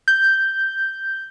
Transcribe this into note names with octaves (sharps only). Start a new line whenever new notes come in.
G6